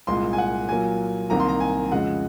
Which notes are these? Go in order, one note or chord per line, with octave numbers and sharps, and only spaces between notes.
C2 A#2 G#3 C6
G#5
F#5
A#2 F#3 A#3 G#5
C2 C3 D#3 A#3 A#5
C6
A#5
G#5
F2 C#3 G#3 F#5